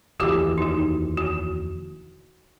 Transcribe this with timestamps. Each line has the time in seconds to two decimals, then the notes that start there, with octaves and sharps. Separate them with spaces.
0.20 F1 D#2 E3 F#4 G4 D6
0.58 D#4 F#4
1.17 F#4